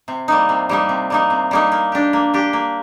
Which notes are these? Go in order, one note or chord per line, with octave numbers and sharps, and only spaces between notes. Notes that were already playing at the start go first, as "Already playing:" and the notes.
C3
G3 A#3 D#4
C3
G3 A#3 D#4
C3
G3 A#3 D#4
C3
G3 A#3 D#4
A#3
D4 G4
A#3
D4 G4
A#3